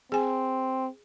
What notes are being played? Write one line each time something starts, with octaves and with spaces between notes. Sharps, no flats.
C4 G#4 G#5